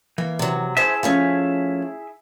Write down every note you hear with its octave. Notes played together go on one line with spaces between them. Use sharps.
E3 A#3
C3 F#3
E4 G#4 C5 E5 A5
F3 A3 C#4